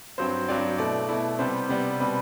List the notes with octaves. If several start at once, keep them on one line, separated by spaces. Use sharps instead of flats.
G2 F#3 C4 C5
G2 F#3 C4 D5
B2 A3 E4 D5
B2 A3 E4
C3 G3 B3 C5
C3 G3 B3
B2 G3 C4 B4